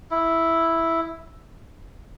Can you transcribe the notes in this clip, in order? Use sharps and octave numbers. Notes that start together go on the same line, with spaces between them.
E4